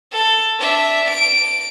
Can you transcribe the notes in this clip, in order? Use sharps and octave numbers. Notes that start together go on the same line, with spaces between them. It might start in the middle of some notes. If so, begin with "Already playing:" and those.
A4
D4 E5
D7